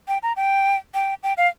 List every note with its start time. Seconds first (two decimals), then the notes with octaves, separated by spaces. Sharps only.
0.08 G5
0.23 A#5
0.36 G5
0.94 G5
1.23 G5
1.37 F5